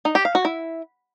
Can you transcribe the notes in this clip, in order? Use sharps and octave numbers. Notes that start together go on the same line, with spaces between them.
D#4
G4
F5
F#4
E4